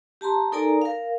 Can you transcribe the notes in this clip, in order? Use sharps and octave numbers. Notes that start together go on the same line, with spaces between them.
G4 A5 A#5 C6
D#4 A4 A#4 D5 G#5 A#5
A#4 F5